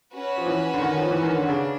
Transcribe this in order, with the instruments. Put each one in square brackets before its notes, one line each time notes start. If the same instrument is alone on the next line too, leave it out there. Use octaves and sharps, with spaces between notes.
[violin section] C#4 F#4 B4
[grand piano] F3
E3
D3
D#3
F3
E3
D#3
D3
[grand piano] C#3 [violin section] D4